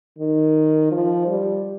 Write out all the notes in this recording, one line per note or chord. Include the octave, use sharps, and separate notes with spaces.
D#3
F3
G3